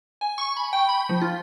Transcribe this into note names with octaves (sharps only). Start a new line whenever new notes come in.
G#5
C#6
B5
G5
B5
F3
F4